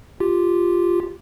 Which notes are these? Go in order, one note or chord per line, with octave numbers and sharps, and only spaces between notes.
F4 G4